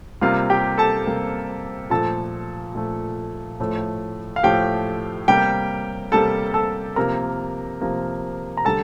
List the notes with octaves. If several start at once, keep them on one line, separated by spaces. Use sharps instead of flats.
C3 G3 A#3 F4 F5
G4 G5
A4 A5
C3 G3 A#3
A#2 F3 A3 A4 A5
A#2 F3 A3
A2 F3 A3
F5
A2 F3 A3 G4 G5
C3 G3 A#3 G4 G5
C3 G3 A#3 A4 A5
A4 A5
C3 F3 A#3 A#4 A#5
C3 F3 A#3
A#5
D3 G3 A4 A5